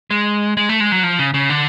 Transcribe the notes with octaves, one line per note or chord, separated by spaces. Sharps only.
G#3
G#3
A3
G#3
F#3
F3
C#3
C#3
D3